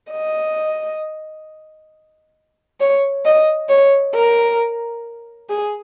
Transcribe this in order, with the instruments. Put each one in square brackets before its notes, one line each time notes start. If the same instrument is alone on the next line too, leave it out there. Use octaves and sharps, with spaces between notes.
[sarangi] D#5
C#5
D#5
C#5
A#4
G#4